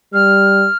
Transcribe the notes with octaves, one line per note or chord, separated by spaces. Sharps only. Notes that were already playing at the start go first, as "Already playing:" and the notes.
G3 F6